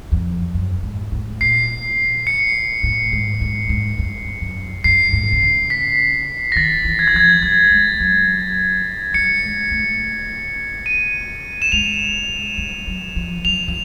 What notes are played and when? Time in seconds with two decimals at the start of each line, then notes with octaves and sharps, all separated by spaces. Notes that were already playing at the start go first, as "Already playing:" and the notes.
0.12 F2
0.54 F#2
0.83 G#2
1.12 A2
1.41 A#2 C7
2.27 C#7
2.83 A2
3.13 G#2
3.41 G#2
3.69 G#2
3.99 G2
4.41 F#2
4.84 G2 C7
5.13 G#2
5.24 B2
5.33 C3
5.42 C#3
5.70 B6
6.52 A#6
6.56 D#3 A6
6.85 E3
6.99 G#6
7.08 A6
7.14 F3 G#6
7.43 G3 A6
7.71 G#3
8.00 F#3
9.14 G3 C#7
9.44 G#3
9.71 A3
10.86 D#7
11.62 E7
11.72 G#3 F7
12.58 G3
12.87 F#3
13.16 F3
13.45 F#3 F7
13.68 F3